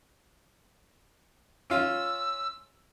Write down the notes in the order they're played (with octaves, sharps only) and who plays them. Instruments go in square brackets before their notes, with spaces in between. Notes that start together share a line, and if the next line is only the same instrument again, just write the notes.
[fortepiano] C#4 F4 [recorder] E6